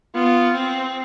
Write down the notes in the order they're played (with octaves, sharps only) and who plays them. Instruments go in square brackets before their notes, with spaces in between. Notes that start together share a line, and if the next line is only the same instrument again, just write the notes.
[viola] B3 [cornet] F4
[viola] C4